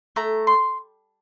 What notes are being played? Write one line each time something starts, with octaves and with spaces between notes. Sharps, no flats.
A3 A#5
C6